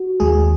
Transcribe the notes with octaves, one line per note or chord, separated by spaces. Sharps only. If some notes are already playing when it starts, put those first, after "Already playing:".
Already playing: F#4
D#2 D#3 G#3 G#4